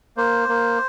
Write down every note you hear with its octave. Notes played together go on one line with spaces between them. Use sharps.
A#3 C5
A#3